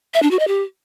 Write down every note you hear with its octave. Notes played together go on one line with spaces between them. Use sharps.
E5
D4
F#4
D#5
G4